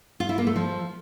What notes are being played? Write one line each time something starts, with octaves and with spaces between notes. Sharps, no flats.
F4
E4
A#3
A3
F3